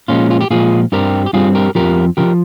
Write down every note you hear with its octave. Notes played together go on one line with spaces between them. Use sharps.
A#2 F3 G#3 C#4 F4
F4
G4
A#2 F3 G#3 F4 G#4
G2 G3 C4 G4 A#4
G4
G2 G3 C4 F4 G#4
G4 A#4
F2 C#3 F3 G4 A#4
C#3 F3 G4 A#4